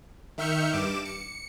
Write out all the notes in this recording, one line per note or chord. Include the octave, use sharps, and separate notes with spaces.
D#3 E5 F6 G6 C#7
G2 D6 E7
C#7